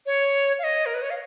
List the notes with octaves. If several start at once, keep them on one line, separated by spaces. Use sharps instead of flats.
C#5
F5
D#5
A#4
B4
C#5
F5